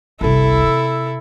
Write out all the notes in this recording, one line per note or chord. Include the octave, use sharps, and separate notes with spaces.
G1 C2 E4 A4
C3